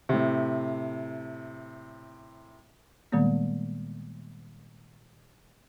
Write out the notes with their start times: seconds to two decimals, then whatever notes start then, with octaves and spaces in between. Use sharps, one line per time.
0.09 A2 C3
3.12 A#2 D#3 G3 G#3 A#3 B3